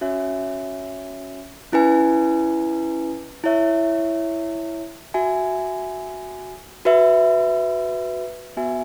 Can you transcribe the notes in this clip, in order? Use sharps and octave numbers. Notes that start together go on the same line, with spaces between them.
C#4 F#4 C#5 E5 G#5
C#4 E4 B4 G#5
E4 C#5 E5
F#4 E5 G#5
F#4 B4 E5
B3 F#4 E5 G#5